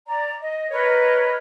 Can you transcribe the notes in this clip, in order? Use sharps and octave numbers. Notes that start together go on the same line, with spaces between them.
D5 A#5
D#5
A#4 B4 C#5 D#5